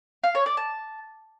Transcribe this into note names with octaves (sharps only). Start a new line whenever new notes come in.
F5
C#5
D5
A5